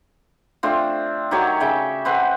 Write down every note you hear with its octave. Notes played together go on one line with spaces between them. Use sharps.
A3 C4 D4 F4
D#3 F#3 G4 C#5
C#3 E5 G5
C4 B4 F#5